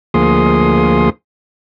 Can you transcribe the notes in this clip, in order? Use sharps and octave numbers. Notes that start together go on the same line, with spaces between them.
D2 F3 A#3 G#4 C6 D#6